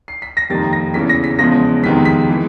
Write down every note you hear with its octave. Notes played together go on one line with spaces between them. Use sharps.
C7
B6
A#6
F2 C3 D#3 G3 A#3 A6
A#6
E2 C#3 E3 B6
A#6
B6
E2 C#3 F3 G#3 B3 A#6
F2 C3 D#3 G#3 B3 B6
B6
E3 G#3